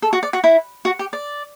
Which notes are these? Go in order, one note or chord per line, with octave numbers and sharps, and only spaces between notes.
A4
F#4
D5
F#4
E4
F#4
G4
D5